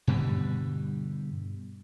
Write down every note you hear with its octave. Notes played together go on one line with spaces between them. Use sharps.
G2 B2 D3 G3